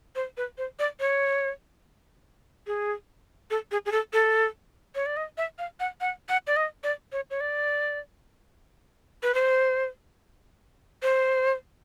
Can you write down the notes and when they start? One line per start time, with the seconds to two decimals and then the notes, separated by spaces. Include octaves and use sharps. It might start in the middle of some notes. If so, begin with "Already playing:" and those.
0.15 C5
0.37 B4
0.58 C5
0.79 D5
1.00 C#5
2.67 G#4
3.50 A4
3.71 G#4
3.86 G#4
3.92 A4
4.13 A4
4.95 C#5
5.06 D5
5.17 D#5
5.37 E5
5.58 F5
5.80 F#5
6.01 F#5
6.29 F#5
6.47 D5
6.56 D#5
6.84 D5
7.12 C#5
7.30 C#5
7.41 D5
9.23 B4
9.34 C5
11.02 C5